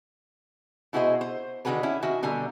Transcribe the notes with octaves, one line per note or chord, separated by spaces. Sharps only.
B2 E4 F#4 G#4 C5 D#5
C5
D3 D#3 C#4 F#4 G#4 B4
C#4 E4
D#3 F#4 E5 G#5
B2 D3 G3 G#5 A#5